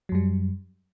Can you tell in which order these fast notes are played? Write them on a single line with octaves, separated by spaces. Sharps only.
F#3 F#2 G3